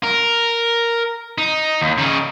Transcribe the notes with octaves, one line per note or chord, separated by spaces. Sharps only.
A#4
D#4
D#2
C#3 D#4